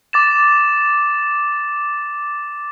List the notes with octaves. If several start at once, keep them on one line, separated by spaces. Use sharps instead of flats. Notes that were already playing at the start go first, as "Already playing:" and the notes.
D6 A6 E7